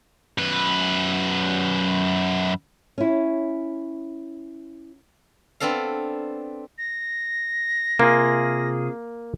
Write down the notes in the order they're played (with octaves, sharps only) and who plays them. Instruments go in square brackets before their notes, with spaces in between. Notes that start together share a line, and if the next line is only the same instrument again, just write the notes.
[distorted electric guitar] F#2 B4
[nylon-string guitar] C#4 E4
[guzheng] B3 C4 D4 A4 F5
[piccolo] A#6
[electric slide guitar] C3 F4 G#4 [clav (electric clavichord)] A#3